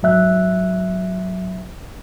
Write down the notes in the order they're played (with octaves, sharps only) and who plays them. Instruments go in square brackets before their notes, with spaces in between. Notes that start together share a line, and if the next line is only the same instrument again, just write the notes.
[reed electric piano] G#2 F#3 E5 F#6